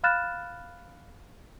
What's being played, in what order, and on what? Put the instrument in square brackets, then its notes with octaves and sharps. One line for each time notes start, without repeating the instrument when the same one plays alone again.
[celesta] F5 B5 F6 F#6 A6 E7